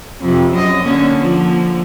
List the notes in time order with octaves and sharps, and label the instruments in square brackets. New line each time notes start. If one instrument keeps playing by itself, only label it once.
[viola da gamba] F2 C3
F#2 D#5
D3 A#3 C#4
D3 F3 A#3